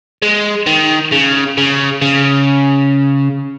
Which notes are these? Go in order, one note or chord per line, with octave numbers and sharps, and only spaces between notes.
G#3
D#3
C#3
C#3
C#3